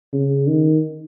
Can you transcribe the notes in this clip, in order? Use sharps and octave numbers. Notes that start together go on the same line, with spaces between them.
C#3
D#3